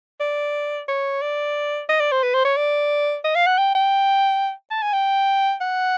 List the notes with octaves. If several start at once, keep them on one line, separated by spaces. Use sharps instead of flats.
D5
C#5
D5
D#5
D5
C5
B4
C5
C#5
D5
D#5
F5
F#5
G5
G5
A5
G#5
G5
F#5